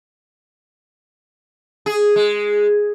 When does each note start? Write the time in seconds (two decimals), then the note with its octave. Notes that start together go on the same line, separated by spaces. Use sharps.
1.86 G#4
2.16 G#3